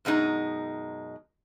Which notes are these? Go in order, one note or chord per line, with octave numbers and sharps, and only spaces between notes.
F#2 B2 G#3 D#4